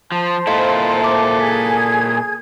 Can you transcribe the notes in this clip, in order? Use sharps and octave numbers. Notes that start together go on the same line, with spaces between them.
F3 C5 A5
A#2 E4 A4 D#5 F5 C6
E5 D6
G#4 G#6 B6